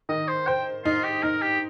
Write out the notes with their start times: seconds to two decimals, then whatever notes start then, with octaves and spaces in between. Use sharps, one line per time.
0.09 D#3 D#5
0.28 C5
0.47 C5 G5
0.84 D#4 F4
1.04 G4
1.23 D#4 A#4
1.42 G4